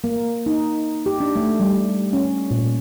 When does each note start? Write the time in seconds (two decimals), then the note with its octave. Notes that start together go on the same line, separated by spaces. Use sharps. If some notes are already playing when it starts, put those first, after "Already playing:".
0.04 A#3
0.46 D#4
1.06 G4
1.20 D4
1.36 A3
1.60 G3
2.13 C#4
2.51 A#2